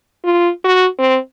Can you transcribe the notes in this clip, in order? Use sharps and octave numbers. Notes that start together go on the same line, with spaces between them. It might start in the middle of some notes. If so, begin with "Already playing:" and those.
F4
F#4
C4